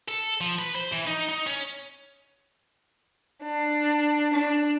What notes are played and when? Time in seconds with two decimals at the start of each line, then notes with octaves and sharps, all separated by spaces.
0.08 A4
0.41 F3
0.59 B4
0.76 C5
0.93 E3
1.08 D#4
1.29 D#4
1.47 C#4
3.43 D4
4.33 D4